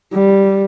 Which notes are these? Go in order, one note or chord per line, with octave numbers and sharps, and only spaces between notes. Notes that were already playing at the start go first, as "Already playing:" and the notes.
G3